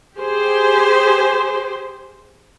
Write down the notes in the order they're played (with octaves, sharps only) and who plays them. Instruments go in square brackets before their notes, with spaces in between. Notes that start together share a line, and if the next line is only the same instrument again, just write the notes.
[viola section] G4 G#4 C5